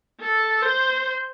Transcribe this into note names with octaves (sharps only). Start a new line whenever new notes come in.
A4
C5